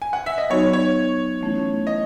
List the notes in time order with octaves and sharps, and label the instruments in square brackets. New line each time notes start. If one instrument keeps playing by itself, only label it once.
[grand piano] G#5
F#5
E5
D#5
[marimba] F#3 B3 D#4 F#4 [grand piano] C#5
[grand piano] C#5
[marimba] E3 A3 C#4 E4
[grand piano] D#5